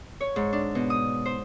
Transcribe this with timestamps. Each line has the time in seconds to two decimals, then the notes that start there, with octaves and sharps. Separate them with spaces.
0.21 C#5
0.36 G#2
0.53 D4
0.75 B2
0.90 D#6
1.25 C5